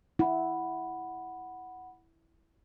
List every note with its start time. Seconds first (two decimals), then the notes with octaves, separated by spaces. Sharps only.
0.19 E4 F#5 B5